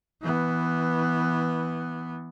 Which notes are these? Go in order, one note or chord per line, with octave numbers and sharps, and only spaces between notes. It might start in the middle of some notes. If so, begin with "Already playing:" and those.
E3 B3